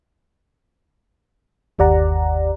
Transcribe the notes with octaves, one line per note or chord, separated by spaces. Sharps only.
G1 D#2 G4 D5 F#5 A#5